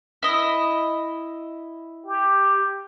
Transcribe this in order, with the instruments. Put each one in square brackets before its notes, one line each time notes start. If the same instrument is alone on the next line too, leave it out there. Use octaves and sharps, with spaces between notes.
[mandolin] E4 D#5
[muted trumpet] G4